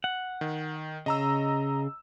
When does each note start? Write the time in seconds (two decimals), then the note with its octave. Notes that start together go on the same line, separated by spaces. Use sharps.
0.04 F#5
0.41 D#3
1.06 C#3 D#5 A#5 E6